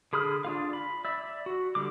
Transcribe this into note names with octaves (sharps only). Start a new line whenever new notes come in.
D3 G#4 B5 D#6 F6
D4 F4 F5
B5
D5 E5
F#4
D3 G3 D6